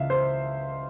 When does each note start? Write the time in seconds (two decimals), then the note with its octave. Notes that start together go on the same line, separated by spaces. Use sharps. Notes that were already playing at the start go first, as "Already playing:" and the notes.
Already playing: C#2 C#3 E3 E5 F5
0.10 C5